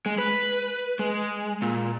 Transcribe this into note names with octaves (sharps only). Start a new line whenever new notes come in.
G#3
B4
G#3
A#2